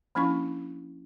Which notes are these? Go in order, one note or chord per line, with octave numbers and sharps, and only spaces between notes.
F3 A#3 C#4 D4 E4 C#6